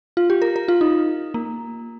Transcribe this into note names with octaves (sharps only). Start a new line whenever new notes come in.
F4
G4
A#4
A#4
F4
D#4
A#3